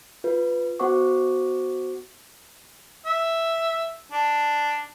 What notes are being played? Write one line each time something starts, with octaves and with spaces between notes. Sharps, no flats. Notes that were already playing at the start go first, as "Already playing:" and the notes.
F4 B4
B3 F#4 C5 F#5 C#6 D6
E5
D4